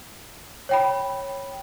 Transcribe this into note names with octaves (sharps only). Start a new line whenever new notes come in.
C#5 G5 B5